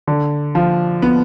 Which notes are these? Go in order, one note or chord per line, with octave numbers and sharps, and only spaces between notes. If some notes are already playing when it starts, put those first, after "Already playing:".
D3
F3
B3